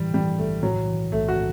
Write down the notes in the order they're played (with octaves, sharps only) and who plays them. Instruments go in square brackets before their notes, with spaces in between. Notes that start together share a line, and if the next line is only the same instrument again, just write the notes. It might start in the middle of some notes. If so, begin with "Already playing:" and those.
Already playing: [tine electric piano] A2 E3 [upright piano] G3
[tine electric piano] E3 [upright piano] G3
[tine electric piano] B1 [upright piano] A3
[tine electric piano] A2 [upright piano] F#3
[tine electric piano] E3
[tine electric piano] B1 [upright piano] A3
[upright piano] F#4